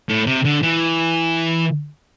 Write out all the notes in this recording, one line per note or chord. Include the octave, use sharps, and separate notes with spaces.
A2
C3
D3
E3